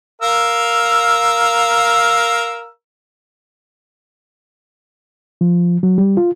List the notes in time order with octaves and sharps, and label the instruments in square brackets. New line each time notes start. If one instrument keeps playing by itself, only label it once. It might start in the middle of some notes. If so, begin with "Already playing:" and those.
[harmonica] A#4 F5 E6
[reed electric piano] F3
F#3
G3
F4